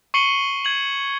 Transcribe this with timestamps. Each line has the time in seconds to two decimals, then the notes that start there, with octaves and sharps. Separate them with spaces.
0.14 C#6 C7 C#7 D#7 F#7 G7
0.65 G#6 F#7